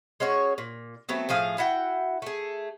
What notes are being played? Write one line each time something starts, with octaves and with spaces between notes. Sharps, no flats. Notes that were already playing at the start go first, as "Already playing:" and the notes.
G#3 C#4 F#4 C#5
A#2
F#3 A3 B3 C4
A2 F3 G#4 F5
E4 F#4 F#5 G5
A3 G#4